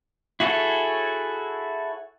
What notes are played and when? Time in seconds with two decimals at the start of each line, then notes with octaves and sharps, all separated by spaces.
0.40 E4 F#4 G#4 A4 C#5